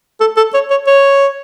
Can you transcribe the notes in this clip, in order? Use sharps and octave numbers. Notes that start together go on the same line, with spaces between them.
A4
A4
C#5
C#5
C#5